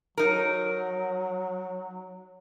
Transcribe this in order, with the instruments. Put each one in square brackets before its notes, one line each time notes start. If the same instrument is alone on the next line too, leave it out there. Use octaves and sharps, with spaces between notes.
[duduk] F#3 [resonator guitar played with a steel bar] D#4 A#4